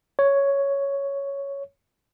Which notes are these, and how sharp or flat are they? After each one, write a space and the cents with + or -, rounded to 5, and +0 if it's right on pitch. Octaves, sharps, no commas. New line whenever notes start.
C#5 +5